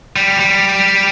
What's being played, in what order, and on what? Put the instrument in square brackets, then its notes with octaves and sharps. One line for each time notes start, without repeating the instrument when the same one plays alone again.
[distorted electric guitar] G3
G3